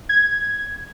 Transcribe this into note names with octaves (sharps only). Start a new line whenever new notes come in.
G#6